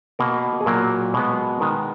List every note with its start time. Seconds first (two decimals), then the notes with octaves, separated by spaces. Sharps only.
0.19 B2 A#3 A#4
0.61 G#4
0.66 A#2 F#3 A#3 A#4
1.14 B2 G#3 B3
1.60 D#3 G#3 B3 A#4